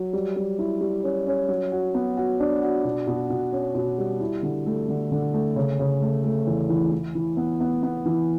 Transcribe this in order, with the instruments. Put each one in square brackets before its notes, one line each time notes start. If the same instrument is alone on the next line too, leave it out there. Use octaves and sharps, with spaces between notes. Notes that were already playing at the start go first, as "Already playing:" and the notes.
Already playing: [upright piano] F#3
G3
G3
E4
G3
C#4
C#4
F#3
F#4
B3
F#4
D4
F#4
B2
B2
B2
C#4
B2
G3
E4
D3
A3
D3
D3
A3
C#3
C#3
A3
A3
E2
E3
E3
E3
B3
B3
B3
E3